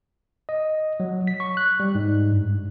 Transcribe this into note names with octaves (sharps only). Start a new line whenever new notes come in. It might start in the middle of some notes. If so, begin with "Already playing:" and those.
D#5
F#3
B6
C#6
F#6
G3
G#2
G2